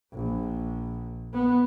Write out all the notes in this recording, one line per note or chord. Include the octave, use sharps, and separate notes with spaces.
A#1
B3